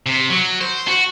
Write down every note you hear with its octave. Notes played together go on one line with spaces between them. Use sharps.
C3
F#3
C5
F#4